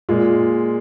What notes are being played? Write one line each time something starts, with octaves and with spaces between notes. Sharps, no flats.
A#2 G#3 F4